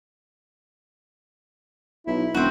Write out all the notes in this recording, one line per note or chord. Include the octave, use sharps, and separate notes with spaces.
B1 E4
E1 C4 F#4